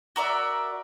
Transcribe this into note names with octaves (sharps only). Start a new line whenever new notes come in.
F#4 A#4 D5 E5